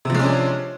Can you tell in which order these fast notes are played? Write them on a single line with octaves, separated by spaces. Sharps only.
C3 F3 G#3 C#4 D4